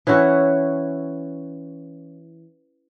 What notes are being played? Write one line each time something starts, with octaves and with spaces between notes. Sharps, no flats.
E3 C#4 E4 F#4